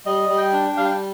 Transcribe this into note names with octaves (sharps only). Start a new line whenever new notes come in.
G3 D#5
G3
G5
D4
G5
G3 F5
G5